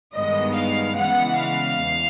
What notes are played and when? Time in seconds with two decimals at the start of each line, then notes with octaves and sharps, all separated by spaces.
0.16 G2 D#3 G#3 B3 D#5
0.57 F5
0.97 C#3 E3 G#3 B3 F#5
1.37 F5
1.79 E2